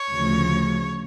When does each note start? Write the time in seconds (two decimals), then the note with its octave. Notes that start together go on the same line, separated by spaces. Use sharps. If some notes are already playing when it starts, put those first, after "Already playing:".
Already playing: C#5
0.12 D2 C#3 F3